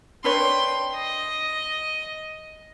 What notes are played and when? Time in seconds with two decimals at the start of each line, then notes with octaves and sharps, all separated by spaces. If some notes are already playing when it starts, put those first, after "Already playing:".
0.24 D4 B4 C#5 G5 C6
0.96 D#5